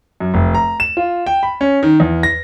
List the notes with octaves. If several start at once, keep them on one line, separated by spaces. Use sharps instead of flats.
F#2
F1
A#5
E7
F4
G5
B5
C#4
D#3
E2
A#6